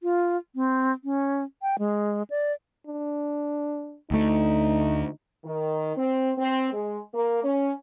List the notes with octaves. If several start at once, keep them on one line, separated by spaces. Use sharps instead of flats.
F4
C4
C#4
G5
G#3
D5
D4
D2 A3 D#4
D#3
C4
C4
G#3
A#3
C#4